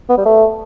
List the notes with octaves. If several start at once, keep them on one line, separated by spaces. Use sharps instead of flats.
B3
G3
A3